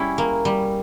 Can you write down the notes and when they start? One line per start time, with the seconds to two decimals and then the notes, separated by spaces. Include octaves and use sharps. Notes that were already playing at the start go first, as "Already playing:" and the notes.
Already playing: G3 C#4 E4
0.18 A#3
0.45 G3